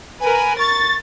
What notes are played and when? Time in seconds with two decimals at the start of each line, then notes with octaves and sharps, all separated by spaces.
0.21 A#4 B4 G#5
0.59 C#6 A6